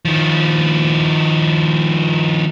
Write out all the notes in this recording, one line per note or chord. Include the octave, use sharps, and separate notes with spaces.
D#3 F3